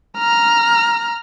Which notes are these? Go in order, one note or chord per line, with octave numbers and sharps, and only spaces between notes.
A#5 F6